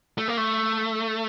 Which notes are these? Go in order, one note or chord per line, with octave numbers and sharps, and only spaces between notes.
A3
A#3
A3